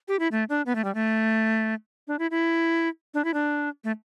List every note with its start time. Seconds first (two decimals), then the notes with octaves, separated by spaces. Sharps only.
0.08 G4
0.19 E4
0.32 A3
0.49 D4
0.66 B3
0.75 A3
0.84 G3
0.95 A3
2.08 D4
2.19 E4
2.31 E4
3.14 D4
3.25 E4
3.34 D4
3.84 A3